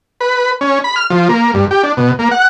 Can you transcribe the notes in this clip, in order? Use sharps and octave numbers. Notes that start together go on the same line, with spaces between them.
B4
C#4
B5
F6
F3
A#3
G2
G4
D4
B2
A#3
F#5